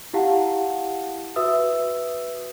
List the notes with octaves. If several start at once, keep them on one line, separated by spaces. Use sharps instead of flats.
E4 G4 F5 F#5 A5
F#4 B4 E5 D#6 E6